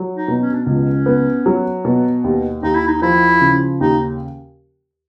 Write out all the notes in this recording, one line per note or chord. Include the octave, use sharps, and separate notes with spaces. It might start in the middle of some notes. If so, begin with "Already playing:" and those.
Already playing: F#3
D#4
B2
C#4
D4
C#2 C#4
B3
F#3
B2
D#2
D#2 D#4
E4
D#4
F3 E4
C#3
D#2 D#4